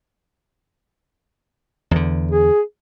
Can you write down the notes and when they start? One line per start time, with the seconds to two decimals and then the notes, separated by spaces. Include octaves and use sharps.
1.91 E2 D3
2.31 G#4